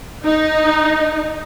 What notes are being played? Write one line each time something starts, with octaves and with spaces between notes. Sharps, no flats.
D#4